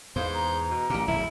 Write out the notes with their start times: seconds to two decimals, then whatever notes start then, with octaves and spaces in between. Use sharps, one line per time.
0.16 E2 G#2 C5 F5
0.33 A#5
0.70 B2
0.90 A1 A#2 G4
1.08 D1 A#1 E2 E4